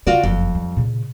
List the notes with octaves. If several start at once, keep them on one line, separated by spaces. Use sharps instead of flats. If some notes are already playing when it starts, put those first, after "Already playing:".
C#3 F4 F#4 D5
F#1 F2
G3
A#2 C#3